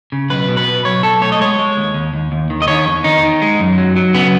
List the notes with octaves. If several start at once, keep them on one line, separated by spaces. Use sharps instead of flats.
C#3
B1 B4
B2
B4
B2
B1 C#5
B1 A4
A3 C#5
D#5
G#3 C#5
G#3
D#2
D#2
D#2
D#2
D#3
D#5
D#3 C#5
E2
D#3 D#4
D#3
G#3
F#2
F#3
F#3
C#3 B3